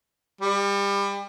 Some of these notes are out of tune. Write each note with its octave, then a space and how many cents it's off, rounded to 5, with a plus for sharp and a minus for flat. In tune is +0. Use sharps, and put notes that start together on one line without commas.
G3 +30